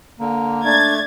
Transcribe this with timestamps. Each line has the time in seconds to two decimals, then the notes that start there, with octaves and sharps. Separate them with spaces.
0.20 D3 A#3
0.64 A3 D4 G#6 A6